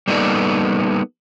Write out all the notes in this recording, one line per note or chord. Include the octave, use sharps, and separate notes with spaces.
G3 A#3 B3 D#4 A4 D5